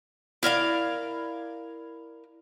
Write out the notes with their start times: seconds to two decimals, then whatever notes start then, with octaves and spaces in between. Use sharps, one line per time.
0.43 E4 A#4 D5 F5